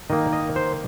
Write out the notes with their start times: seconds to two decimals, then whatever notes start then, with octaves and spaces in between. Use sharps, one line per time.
0.10 D#3 A#3 D#5
0.33 D#5
0.56 C5